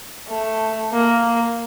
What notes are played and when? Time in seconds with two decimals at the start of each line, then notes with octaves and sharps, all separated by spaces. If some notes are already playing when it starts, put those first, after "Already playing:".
0.29 A3
0.93 A#3